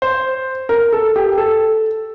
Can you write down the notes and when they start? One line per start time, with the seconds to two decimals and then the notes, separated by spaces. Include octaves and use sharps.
0.02 C5
0.69 A#4
0.93 A4
1.16 G4
1.38 A4